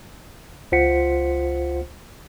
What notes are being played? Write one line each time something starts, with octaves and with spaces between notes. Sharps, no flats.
C#2 F4 C5 F#5 B6 C#7